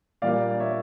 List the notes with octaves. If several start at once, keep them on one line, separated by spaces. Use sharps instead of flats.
A#2 G3 A#3 D5 F5
D5
C#5 E5